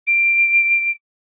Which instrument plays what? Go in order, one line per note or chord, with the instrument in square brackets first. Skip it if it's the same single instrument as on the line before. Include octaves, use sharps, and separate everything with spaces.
[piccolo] D7